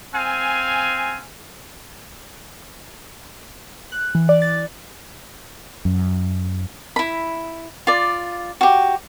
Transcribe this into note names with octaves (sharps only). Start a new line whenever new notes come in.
C4 F5 G#5
F#6
E3
D5
A6
F#2
E4 B5
F4 D5
F#4 G4